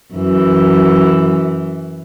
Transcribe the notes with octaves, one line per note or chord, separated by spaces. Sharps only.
F#2 E3